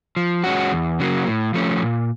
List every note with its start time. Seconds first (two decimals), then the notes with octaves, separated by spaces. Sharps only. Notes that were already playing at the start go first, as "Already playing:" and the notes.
0.17 F3
0.44 G#3 C#4 F#4
0.72 E2
1.00 C#3 F#3 A#3
1.27 A2
1.54 F3 A3 C#4
1.82 A#2